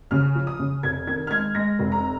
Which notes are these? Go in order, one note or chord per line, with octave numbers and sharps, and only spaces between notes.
C#3 F6
F3
D#6
C#3
F1 G#6
D#3 G#6
F6
G#3 G#6
G#3 A#6
F1
A#5